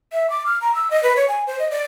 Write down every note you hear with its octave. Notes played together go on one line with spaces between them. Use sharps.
E5
D6
F6
A#5
E6
D#5
B4
C#5
G#5
C5
D#5
D5